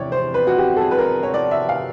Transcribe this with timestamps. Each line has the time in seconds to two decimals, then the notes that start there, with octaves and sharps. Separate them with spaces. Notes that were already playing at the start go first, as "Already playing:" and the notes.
Already playing: E2 C3 E3 C#5 D5
0.12 C5
0.34 B4
0.47 F#4
0.58 G4
0.77 A4
0.81 G#4
0.91 B4
0.98 A#4
1.23 C#5
1.34 D5
1.51 E5
1.69 F5